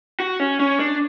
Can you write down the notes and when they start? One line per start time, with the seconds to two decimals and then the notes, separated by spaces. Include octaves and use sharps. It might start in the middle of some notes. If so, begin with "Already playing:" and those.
0.20 F#4
0.40 C#4
0.60 C#4
0.80 D4